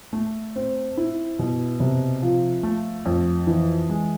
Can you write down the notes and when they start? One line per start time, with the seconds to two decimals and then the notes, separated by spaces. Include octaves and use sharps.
0.13 A3
0.56 C4
0.97 E4
1.39 B2
1.80 C3
2.22 F3
2.63 A3
3.06 F2
3.47 E3
3.90 G#3